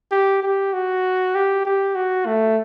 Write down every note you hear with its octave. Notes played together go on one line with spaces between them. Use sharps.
G4
G4
F#4
G4
G4
F#4
A3